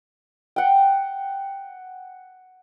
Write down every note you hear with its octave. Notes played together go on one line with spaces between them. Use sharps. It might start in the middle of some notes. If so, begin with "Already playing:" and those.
F#5 G5